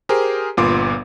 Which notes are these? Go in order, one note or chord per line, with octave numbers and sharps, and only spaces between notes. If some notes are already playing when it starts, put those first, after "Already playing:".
G4 G#4 A#4 C5
G1 A#2 B3 F4 C6 D6